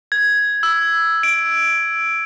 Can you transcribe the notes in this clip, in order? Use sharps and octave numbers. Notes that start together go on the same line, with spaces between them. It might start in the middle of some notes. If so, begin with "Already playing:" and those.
G#6
E6
D7